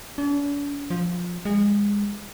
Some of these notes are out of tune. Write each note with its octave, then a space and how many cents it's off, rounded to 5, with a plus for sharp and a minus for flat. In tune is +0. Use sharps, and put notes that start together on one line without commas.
D4 -45
F3 +10
G#3 -25